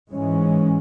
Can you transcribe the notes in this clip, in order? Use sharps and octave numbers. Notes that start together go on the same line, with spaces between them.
G#2 E3 G#3 C#4